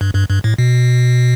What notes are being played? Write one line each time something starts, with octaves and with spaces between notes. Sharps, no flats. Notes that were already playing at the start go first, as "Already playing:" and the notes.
G2
G2
G2
A2
B2